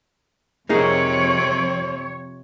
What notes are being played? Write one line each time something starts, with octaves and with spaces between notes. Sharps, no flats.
F2 C3 A#3 C4 D#4 G#4 C#5